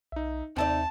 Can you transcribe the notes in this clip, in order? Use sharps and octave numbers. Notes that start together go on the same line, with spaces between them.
B1 D#4 E5
D#2 C3 C4 D#4 D5 E5 A5